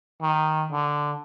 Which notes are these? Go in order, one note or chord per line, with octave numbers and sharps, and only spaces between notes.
D#3
D3